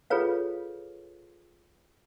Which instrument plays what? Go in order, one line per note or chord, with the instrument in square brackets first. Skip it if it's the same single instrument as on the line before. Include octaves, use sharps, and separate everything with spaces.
[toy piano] F4 G#4 A4 B4 C#5 F5